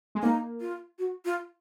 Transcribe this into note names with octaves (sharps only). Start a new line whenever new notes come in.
G#3
A#3 D#4
F4
F#4
F4